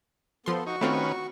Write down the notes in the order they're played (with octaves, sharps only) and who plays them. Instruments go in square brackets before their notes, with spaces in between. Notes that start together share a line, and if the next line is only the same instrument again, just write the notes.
[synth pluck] F3 C6 [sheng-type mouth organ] B3 A4
[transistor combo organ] D#4 [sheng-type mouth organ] F#4 C#6
[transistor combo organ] D#3 C#4 B4 [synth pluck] A3 C4 F4